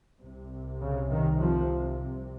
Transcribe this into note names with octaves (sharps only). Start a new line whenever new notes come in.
C2 C3
C#3
D#3
F3